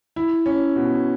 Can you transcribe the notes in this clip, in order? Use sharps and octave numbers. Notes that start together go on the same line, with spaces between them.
E4
C#4
B2